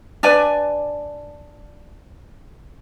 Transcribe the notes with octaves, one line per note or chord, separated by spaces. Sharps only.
D4 B4 D5 G#5